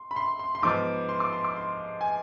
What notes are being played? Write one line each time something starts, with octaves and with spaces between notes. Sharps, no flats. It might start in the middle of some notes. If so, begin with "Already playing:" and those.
Already playing: C6
B5
C6
C6
C6
G#2 F3 B3 D6
C6
D6
C6
D6
C6
G#5